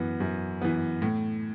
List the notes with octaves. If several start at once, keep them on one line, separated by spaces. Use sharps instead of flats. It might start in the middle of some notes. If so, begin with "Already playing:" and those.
Already playing: F#2 E3 B3
F#2
E3 B3
A2